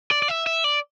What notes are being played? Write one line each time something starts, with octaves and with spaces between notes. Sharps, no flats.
D5
D5
E5
E5
D5